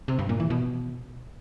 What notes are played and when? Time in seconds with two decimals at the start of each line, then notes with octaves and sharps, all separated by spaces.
0.08 C3
0.19 G2
0.29 A#2
0.40 E3
0.50 B2